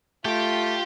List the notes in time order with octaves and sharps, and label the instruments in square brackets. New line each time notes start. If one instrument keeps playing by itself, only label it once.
[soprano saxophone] A3 [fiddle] F4 [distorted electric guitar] G4 G5